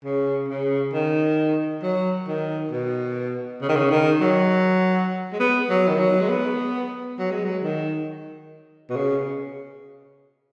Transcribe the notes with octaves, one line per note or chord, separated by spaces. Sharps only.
C#3
C#3
D#3
F#3
D#3
B2
C#3
D#3
C#3
D#3
F#3
G#3
B3
F#3
D#3
F#3
G#3
B3
F#3
G#3
F#3
D#3
B2
C#3